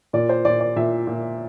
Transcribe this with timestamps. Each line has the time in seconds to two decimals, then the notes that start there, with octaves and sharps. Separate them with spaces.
0.13 A#2 D5
0.29 C5
0.45 A#2 D5
0.60 D5
0.76 A#2 E5
1.07 A#2